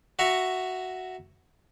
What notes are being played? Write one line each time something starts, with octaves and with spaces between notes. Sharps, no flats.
F#4 E5 F#5 A#5 C#6